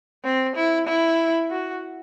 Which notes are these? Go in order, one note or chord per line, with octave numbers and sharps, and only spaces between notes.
C4
E4
E4
F#4